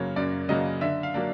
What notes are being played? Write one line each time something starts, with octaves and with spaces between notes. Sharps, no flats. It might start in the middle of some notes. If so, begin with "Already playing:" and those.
Already playing: F#2 C#3 F#3 A#3 C#5
F#2 D5
C#3 F#3 A#3 D#5
D3 E5
F5
F#3 A#3 D4